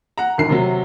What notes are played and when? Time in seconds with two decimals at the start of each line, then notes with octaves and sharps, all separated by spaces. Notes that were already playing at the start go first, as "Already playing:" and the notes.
0.18 F#5 A#5
0.38 E1 D#2 C7
0.50 C3 F#3